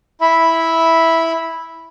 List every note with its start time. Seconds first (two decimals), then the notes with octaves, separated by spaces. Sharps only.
0.21 E4 E5 B5